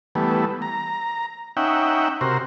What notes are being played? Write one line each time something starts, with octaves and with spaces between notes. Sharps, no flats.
E3 G3 A3 B3
A#5
C#4 D#4 E5 F#5 G5
C3 F#4 A#4 C5